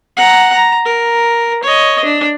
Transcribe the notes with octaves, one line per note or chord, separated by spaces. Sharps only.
F#5 A#5
A#5
A#4
C#5 D#5
D4